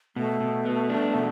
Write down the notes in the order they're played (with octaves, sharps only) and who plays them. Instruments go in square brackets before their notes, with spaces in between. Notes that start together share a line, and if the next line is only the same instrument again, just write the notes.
[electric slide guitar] B2 [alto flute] A3
[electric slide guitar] B2
B3
D4
B2